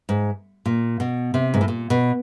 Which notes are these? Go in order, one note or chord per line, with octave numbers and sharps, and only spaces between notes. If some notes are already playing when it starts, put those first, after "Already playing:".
G#2
A#2
B2
C3
G#2
A2
A#2
B2